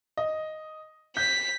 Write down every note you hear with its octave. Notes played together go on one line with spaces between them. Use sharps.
D#5
G6 B6